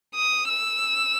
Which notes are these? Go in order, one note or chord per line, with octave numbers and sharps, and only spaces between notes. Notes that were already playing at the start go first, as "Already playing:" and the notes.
D#6
E6